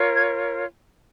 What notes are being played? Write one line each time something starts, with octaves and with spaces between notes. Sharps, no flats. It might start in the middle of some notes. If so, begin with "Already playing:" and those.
Already playing: F4 A#4 C#5
G#6